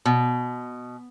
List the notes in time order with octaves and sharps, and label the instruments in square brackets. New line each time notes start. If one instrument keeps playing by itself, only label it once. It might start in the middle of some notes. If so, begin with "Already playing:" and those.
[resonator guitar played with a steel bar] B2